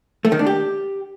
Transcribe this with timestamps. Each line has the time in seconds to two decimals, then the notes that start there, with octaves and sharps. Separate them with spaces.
0.25 A3
0.32 D#3
0.39 D4
0.47 G4